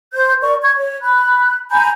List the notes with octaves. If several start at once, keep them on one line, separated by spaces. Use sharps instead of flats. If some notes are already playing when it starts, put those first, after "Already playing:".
C5 G6
A#4 D5 C#6
C#6 G#6
C#5
B5 F#6
G#5 A#5 B5 G6